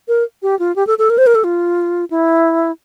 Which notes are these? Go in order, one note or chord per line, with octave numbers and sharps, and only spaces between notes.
A#4
G4
F4
G4
A4
A4
A#4
C5
A#4
A4
F4
E4